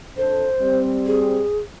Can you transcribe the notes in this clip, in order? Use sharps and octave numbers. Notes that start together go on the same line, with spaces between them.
F2 D4 A4 C5
G3 C4
G#4